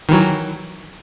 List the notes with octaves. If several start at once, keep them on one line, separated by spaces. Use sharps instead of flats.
D#3 E3 F#3